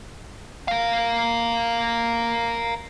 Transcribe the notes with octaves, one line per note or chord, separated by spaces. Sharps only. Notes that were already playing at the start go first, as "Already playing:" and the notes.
A#4 F5